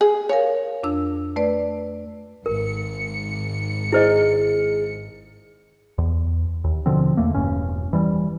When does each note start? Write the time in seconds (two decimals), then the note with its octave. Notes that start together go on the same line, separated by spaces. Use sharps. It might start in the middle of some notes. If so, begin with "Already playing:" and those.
0.01 G#4
0.29 A#4 C#5 F5 G#5
0.83 F2 D4 E6
1.36 A3 B4 D5
2.46 G#1 A#4 C#7
3.92 E4 G#4 C5 D#5
5.98 E2
6.64 D#2
6.86 B2 D3 F3 C4
7.17 E2 A3 A#3
7.34 E1 G2 C#4
7.93 E3 G3